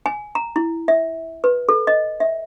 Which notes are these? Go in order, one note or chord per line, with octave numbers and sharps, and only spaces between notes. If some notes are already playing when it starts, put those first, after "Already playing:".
G#5
A#5
E4
E5
B4
A4
D#5
E5